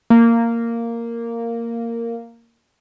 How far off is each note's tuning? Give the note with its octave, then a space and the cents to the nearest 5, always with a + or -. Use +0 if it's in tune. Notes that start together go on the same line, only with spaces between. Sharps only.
A#3 -10